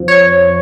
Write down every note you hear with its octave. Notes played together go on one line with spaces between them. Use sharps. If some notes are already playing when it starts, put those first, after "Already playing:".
Already playing: F2 F3
C#5